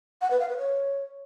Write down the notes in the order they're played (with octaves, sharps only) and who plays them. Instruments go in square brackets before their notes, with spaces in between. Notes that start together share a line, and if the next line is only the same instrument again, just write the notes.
[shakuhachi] F#5
B4
F5
B4
C#5